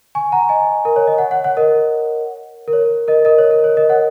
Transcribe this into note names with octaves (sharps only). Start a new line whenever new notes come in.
G#5 C#6
F#5 A#5
D#5 G#5
A#4
C#5
D#5
C#5 F#5
C#5 F#5
C#5 F#5
A#4 D#5
A#4
C#5
A#4 D#5
A#4 D#5
C#5
A#4
C#5
A#4 D#5
C#5 F#5